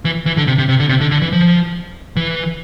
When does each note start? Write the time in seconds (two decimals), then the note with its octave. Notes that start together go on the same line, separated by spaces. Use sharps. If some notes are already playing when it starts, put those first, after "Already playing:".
0.05 E3
0.26 E3
0.37 D3
0.47 C3
0.58 C3
0.69 C3
0.80 D3
0.89 C3
1.01 D3
1.11 D3
1.22 E3
1.33 F3
2.16 E3